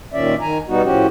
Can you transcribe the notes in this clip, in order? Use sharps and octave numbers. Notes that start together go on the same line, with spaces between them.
A#2 D#3 C#4 D5 E5
D#3 G#5 A#5
B2 G3 B3 D#4 F#4
A2 F3 C#4 F#4 G4